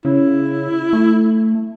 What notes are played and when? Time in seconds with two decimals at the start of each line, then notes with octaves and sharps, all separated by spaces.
0.05 C#3 E4
0.93 A3